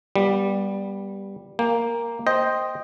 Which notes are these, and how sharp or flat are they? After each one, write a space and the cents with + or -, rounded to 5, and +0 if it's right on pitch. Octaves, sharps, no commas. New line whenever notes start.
G3 +0 B3 -25
A#3 +0 G5 +35
C5 +0 D#5 +0 G5 +0